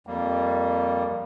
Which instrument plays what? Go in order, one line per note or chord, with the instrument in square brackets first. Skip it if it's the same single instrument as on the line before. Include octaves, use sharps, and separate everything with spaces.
[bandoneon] F2 G3 A#3